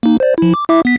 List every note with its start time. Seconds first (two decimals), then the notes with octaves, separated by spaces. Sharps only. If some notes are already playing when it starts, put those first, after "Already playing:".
0.03 A#3 D#4
0.20 C5 D5
0.38 F3 E4
0.54 D6
0.69 E4 E5 D6
0.85 B3 B6